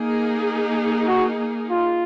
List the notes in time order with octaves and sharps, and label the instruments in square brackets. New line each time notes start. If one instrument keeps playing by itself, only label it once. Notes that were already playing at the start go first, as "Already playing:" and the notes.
Already playing: [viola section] A#3 D#4 G#4
[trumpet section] F#4
F4